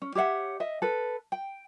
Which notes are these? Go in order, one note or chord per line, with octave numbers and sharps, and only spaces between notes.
C#4
G4 C#5 E5 F#5
D#5 E5
A4 B4
G5